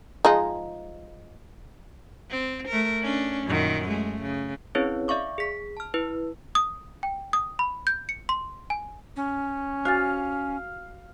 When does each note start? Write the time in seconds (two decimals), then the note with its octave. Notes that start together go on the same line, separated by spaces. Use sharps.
0.25 F3 G#3 D#4
2.31 C4
2.68 A3 A#4
3.02 C#4 D4
3.46 F#2 A#2 D#3
3.89 G#3 A3
4.22 C#3
4.75 C4 C#4 E4 G#4 B4 C#5
5.08 D5 E5 F5 C#6 D6
5.38 G#4 B6
5.77 A5 F6
5.94 E4 B4
6.55 D#6
7.03 G5
7.33 D#6
7.59 B5
7.87 G6
8.09 C#7
8.29 C6
8.70 G#5
9.16 C#4
9.85 F#4 F5 G#5 A6